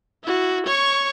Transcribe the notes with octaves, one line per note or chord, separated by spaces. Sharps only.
E4 F#4
C#5 C#6